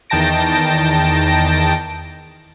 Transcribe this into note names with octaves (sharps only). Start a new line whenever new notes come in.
E2 D#3 G5 A5 A#6 D7